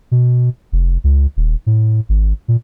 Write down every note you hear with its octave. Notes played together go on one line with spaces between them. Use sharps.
B2
F1
C#2
D#1
A2
G#1
A#2